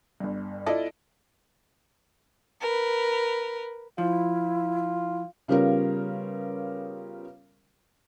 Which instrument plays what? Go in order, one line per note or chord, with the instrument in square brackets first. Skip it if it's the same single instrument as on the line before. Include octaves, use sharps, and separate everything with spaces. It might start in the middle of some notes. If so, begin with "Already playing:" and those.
[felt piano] G1 G2
E4 F4 A4 D5 D#5
[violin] A#4 B4
[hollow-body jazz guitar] F3 [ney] E4 [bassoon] F4
[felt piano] C#3 G3 B3 C#4 F4 A#4